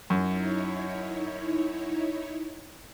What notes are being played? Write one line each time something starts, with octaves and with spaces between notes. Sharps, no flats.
F#2 D#4 E4 C#5